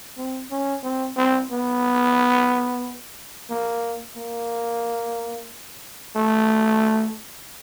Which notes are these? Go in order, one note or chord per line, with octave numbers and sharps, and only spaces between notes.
C4
C#4
C4
C4
B3
A#3
A#3
A3